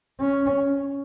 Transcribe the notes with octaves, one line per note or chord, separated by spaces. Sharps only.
C#4